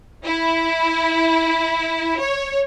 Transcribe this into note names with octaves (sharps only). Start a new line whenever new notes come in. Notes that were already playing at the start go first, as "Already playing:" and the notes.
E4
C#5